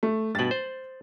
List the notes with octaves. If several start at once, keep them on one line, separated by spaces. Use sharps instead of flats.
A3
G2 B2 A6 F#7
C5